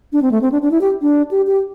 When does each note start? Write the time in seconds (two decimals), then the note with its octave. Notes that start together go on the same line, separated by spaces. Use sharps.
0.13 D4
0.22 C4
0.32 A3
0.42 C4
0.52 D4
0.62 D4
0.71 E4
0.81 G4
1.02 D4
1.31 G4
1.47 G4